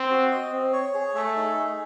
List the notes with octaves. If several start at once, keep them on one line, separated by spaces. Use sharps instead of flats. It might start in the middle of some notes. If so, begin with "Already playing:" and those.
Already playing: C4
F#4
D#5
C4
C#5
G#4
A3 E5
D#4
G#4